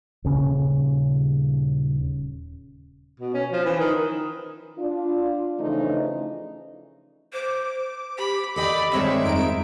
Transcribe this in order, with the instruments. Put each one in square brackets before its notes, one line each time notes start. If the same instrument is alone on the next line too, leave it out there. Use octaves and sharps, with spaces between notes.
[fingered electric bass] D#1 C#3 C#4
[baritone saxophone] B2
C#4
F3
E3
D#3
[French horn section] D4 F4
C#3 E3 F3 A3 D4 D#4
[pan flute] C5 [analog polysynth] D6
[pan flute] G4 [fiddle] B5
[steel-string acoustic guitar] A4 D#5 G5 [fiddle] D5 B5
[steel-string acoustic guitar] G2 D#3 G#3 [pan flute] C4 [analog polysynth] C5 C#5 [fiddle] E5
[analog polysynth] F2 D#4 D7